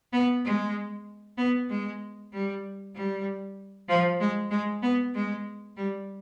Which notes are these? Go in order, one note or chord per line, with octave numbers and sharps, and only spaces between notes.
B3
G#3
B3
G#3
G3
G3
F3
G#3
G#3
B3
G#3
G3